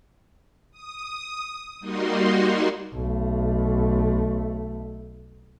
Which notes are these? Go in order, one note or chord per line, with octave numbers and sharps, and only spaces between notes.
D#6
G3 A#3 D#4 F#4 C6
B1 A3